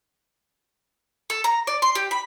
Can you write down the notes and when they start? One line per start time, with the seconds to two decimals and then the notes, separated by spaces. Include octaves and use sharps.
1.30 A4
1.44 A#5
1.67 D5
1.82 C6
1.95 G4
2.11 B5